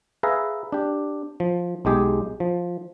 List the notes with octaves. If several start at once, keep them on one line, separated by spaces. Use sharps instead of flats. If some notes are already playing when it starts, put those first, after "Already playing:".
G#4 B4 E5 F5 A#5
D4 G4
F3
B1 G#3 G4 G#4
F3